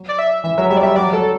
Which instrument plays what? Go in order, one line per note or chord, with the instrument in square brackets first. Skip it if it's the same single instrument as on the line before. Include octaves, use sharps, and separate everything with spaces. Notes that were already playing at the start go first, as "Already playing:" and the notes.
Already playing: [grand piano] F#3
[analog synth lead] D5
E5
[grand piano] E3 [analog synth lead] E5
[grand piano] F#3 [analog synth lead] E5
[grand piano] G3 [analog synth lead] E5
[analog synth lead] D5
[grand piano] G3 [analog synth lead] E5
[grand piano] F#3 [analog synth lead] D5
[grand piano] F#3 [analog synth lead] A4